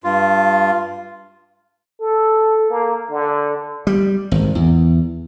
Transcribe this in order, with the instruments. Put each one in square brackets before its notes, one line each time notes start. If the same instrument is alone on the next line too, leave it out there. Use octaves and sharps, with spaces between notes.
[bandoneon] G2 F4
[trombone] A4
A#3
D3
[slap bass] G3
G#1
E2